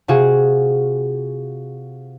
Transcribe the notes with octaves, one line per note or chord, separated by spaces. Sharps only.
C3 F4 F#4 G#4